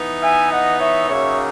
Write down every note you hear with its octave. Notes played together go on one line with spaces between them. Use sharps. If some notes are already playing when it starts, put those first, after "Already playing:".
Already playing: E3 B3 D#4
E5 G#5
D#5 F#5
C#5 E5
C#3 F#3 A#3 D#4 C#5 E5